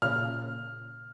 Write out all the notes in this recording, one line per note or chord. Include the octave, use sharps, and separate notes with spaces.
A#2 C#3 F6